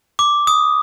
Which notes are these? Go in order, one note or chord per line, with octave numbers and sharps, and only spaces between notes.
D6
D#6